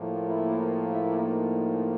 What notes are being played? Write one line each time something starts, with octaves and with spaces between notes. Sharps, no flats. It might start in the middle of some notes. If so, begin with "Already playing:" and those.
Already playing: A2 F3 A#3
E4
E4
D#4